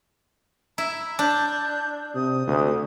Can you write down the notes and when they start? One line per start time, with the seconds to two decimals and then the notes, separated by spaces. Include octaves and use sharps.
0.78 E4 E5 A#5
1.19 D4 G6
2.15 C3 D#6
2.48 D2